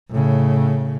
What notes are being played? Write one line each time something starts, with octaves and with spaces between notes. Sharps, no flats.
A2 C#3